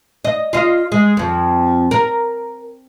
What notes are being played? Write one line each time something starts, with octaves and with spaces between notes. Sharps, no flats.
D#5
F4 D#5
G#3
F2 F3
A#4